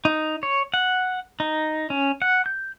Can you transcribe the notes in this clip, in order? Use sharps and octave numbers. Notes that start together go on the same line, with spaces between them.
D#4
C#5
F#5
D#4
C#4
F#5
G6